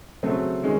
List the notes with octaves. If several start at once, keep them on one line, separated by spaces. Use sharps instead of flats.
C#3 F#3 A3 C4
D#3 G#3 C#4